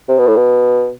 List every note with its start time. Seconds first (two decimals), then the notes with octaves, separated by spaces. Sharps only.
0.08 C3
0.18 B2
0.27 A2
0.36 B2